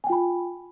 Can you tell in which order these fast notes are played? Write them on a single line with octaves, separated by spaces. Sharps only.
G#5 G5 F4 B5